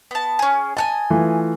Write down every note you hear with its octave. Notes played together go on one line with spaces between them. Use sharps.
B3 A5
C#4 G#4
D#5 F#5 G#5 A5
E3 A3 F4